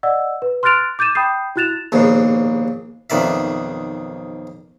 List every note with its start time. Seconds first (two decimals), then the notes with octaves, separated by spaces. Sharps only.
0.03 D5 D#5 F#5 E6
0.42 B4
0.63 C6 F6 F#6 A6 D7 F7
0.99 D6 G6 A6 D#7 E7
1.15 G5 B5 D#6 G6 C7
1.56 E4 F#4 F#6 A6 E7 F7
1.92 A#1 D#2 G#2 B2
3.10 B1 F2 D#3 D5 E5